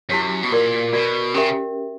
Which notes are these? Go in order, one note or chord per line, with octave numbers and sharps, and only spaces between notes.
F#2 E4 G4 C#5
B2
A#2 F#4 A#4 D5
B2 F#4 A#4 D5
C#3 C#4 G4 A#4 E5 G5